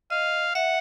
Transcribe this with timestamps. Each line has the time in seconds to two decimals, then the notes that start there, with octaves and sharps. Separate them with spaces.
0.10 D#5 F5
0.55 E5 F#5